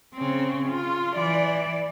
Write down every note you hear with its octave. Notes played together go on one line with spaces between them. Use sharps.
C#3 C4
F4
E3 D5